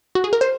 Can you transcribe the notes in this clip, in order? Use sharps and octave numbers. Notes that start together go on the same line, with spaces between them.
F#4
G#4
A#4
C5